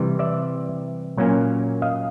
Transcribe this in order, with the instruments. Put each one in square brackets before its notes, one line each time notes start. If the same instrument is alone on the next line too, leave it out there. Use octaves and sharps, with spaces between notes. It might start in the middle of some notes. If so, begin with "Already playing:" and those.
Already playing: [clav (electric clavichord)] C3 E3 G3
D5 E5
A#2 F#3 A#3 C#4
D#5 F5